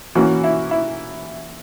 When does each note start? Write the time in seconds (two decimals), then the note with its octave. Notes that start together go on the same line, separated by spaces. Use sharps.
0.15 E3 A#3 C#4 F#4
0.44 E4
0.71 E4